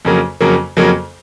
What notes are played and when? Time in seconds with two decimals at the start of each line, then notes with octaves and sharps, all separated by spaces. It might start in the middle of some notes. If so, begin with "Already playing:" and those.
0.05 F2 C#3 F#3 A#3
0.41 F2 C#3 F#3 A#3
0.77 F2 C#3 F#3 A#3